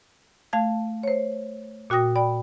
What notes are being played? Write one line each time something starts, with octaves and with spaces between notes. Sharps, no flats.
A3 F5 A5 G#6
C5 C#5
A#2 F#4 G5 D#6 A#6
D5 G5 B5